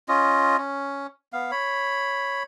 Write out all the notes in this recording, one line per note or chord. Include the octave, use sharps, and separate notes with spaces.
C#4 F4 D#5
C#4
B3 F5
C#5 B5